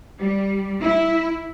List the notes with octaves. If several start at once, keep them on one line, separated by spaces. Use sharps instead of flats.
G3
E4